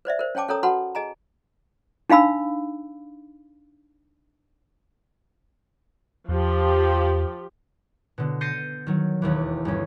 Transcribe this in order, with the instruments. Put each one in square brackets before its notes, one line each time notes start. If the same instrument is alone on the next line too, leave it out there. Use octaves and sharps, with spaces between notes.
[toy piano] B4 C5 D5 E5
A#4 C5
C#4 C#5 G5 A5 D6
C#4 A4 A#4 C#5 A#5 D#6
F#4 B4 F#5 A5 B5 C6
G#4 D#5 G#5 A#5
D4 D#4 F5 B5 E6
[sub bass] E2 [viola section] F3 G4
[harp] B2 D3
G6 A6 A#6 C7 C#7 D#7
D#3 F#3
E1 D#2 E3
G1 C#4